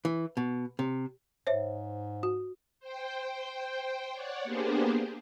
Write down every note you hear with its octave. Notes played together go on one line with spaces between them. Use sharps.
E3
B2
C3
G#2 C5 C#5 E5
F#4
C5 G5
C#5 D5 F#5
A#3 B3 D4 G4 G#4 C5